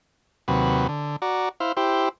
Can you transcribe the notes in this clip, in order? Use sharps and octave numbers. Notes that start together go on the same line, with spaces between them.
D#2 C3 F#3 B4
D3
F#4 D5 A#5
E4 C5 F5
E4 G4 C5